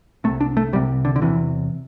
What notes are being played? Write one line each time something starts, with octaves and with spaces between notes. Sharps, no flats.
C2 C3 A3
D4
A3
C2 C3 G3
D3
D3
E1 E2 C3 E3